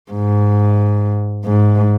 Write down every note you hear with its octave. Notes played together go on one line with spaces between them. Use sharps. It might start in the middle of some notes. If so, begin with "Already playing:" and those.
G#2
G#2